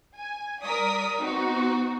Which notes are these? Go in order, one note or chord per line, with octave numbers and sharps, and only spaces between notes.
G#5
G3 A#4 D5 D#6 B6
B3 C4 D#4 F#4